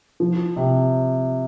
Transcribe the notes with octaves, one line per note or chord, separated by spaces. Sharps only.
F3
C3